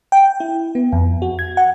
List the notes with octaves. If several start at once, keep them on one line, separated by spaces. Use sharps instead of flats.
G5
E4
B3
F2
F#4
G#6
F#5